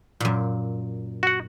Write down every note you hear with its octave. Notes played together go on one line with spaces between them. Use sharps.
F#2 A#2
F#4 F#5